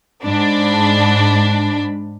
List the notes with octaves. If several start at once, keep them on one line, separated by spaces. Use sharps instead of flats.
G#2 D4 B5